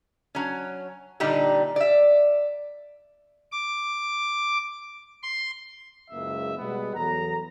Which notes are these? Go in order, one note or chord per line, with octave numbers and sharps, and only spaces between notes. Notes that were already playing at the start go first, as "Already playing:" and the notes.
F#3 C#4
A#2 D3 G3 D#4 G4
D5 E5
D6
C6
F#1 C#2 G#3 A#3 E5
B2 G3 G#3 B3
E2 F#3 A4 A#5